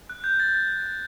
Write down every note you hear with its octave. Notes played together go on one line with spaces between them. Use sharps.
F#6
G6
A6
A6